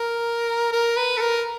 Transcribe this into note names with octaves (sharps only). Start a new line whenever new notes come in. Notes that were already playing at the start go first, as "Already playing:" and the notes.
Already playing: A#4
A#4
B4
A4
A#4